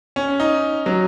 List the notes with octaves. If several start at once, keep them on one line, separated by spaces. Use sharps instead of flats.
C#4
D#4
F#3